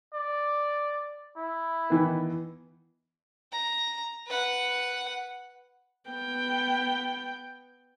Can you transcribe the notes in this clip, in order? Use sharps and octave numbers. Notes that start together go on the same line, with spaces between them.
D5
E4
D#3 E3 B3
A#5
B4 F#5
B3 G5